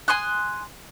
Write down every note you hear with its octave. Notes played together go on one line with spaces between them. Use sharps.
G#5 C6 D#6 F#6